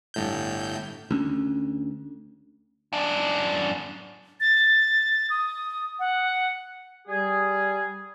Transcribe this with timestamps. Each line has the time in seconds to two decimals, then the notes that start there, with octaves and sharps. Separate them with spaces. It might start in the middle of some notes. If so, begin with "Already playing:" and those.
0.14 G1 A2 G6
1.11 D2 C#4
2.93 F#2 D4
4.40 A6
5.30 D#6
5.99 F#5
7.08 G3 G#4